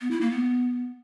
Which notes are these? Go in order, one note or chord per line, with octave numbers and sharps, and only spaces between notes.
B3
E4
A#3
B3